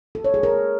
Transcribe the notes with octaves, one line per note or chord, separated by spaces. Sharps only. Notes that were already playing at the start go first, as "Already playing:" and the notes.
A4
C#5
G#4
A#4